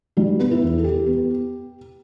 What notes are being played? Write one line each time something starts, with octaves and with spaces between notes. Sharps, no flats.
G3 F#4
B3
E4
E2
A4
E3 G4
B3